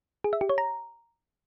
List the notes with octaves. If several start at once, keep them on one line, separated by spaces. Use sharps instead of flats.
G#4
E5
G4
C#5
A#5